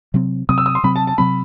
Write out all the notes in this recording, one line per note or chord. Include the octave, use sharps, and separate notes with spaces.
C3 F#3 C4
C3 F#3 C4 D#6
E6
D#6
C6
C3 F#3 C4 B5
A5
A5
C3 F#3 C4 B5